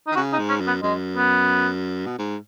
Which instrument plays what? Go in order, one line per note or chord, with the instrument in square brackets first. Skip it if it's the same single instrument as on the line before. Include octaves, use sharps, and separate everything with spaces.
[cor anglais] D#4
[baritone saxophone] D#3
[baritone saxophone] C#3 [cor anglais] F#4
[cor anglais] D#4
[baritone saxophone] G#2
[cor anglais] C#4
[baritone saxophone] F#2
[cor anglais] B3
[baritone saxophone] F#2 [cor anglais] G#3
[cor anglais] B3
[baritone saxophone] B2
G#2